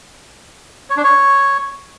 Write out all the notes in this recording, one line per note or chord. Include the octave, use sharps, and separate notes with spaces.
C#5
D4
C#5